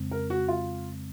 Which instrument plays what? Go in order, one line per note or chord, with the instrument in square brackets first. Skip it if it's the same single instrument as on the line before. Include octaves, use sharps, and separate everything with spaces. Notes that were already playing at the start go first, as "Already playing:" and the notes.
Already playing: [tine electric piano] F2 C#3 G#3 C4
[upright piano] A#4
F#4
F4